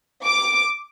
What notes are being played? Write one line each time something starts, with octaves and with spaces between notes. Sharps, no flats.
D6